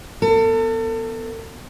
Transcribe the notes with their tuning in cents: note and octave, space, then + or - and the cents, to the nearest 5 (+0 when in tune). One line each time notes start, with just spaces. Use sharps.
B3 +0 A4 +35